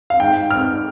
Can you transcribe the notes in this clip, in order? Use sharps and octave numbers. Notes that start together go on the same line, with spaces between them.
F5
G#2 G5
G#2 F6